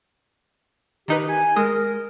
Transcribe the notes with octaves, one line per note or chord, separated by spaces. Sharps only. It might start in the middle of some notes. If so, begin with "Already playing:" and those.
D#3 D#4 G4 B4
G#5
G#3 A#4 D#6